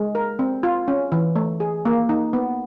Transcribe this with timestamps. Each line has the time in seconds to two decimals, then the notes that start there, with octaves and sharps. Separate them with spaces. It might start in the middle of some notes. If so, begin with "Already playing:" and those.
Already playing: G#3
0.15 A#4
0.39 C4
0.63 F4
0.88 C#4
1.12 E3
1.36 A3
1.60 G#4
1.85 A#3
2.09 D#4
2.33 B3